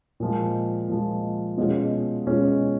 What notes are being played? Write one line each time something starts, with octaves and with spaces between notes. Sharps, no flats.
A#2 F3 G#3
A#2 F3 G#3
B2 G#3 C#4 F4 G#4
B2 G#3 C#4 F4 G#4